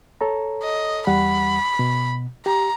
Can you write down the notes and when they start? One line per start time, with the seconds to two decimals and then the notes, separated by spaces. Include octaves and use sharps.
0.21 A4 C#5 A#5
0.63 D#5
1.07 E2 G3 F#5 B5
1.79 B2
2.46 G4 A#5